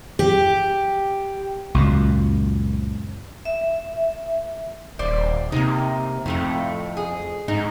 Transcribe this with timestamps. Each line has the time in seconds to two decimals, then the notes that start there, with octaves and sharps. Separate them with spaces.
0.19 G4
1.74 C#2 F#2 A#2
3.45 E5
4.99 D#1 C5 D5
5.52 C3 A#3 D#4
6.26 F2 A2 A3 C4
6.97 G#4
7.48 G#2 D#4